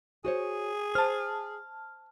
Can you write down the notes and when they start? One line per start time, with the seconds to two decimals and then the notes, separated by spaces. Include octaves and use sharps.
0.25 F#4 G#4 C5 C#5
0.95 C5 A5 F6